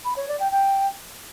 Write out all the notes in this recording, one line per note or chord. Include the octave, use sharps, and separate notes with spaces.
B5
C#5
D5
G5
G5